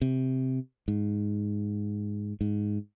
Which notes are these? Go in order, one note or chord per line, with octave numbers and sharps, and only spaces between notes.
C3
G#2
G#2